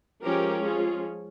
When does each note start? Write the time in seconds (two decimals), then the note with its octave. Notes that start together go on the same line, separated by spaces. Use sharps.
0.23 F3 G#3 C#4 G4 A#4
0.64 F4 G#4